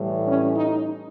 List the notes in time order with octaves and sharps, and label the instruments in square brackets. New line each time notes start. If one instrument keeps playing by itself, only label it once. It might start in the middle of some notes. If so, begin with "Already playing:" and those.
Already playing: [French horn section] A2 E3 G3
C#4
D#4